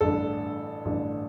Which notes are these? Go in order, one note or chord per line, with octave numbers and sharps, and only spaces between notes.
A1 G2 D3 A4
A1 G2 D3